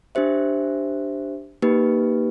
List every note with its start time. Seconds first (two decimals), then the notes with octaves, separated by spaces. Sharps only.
0.15 D4 G4 C5 E5
1.62 A#3 D#4 G4 B4